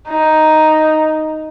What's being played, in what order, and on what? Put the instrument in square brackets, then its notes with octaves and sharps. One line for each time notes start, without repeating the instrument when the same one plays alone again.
[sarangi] D#4